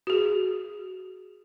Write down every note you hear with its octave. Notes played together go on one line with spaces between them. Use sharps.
F#4 G#4